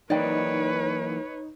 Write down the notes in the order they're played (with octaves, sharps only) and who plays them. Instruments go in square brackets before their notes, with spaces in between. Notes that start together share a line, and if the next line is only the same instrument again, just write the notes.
[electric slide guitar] E3 F#3 A#3 [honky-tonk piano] D#4 [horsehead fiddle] B4 C#5 [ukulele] D5 G5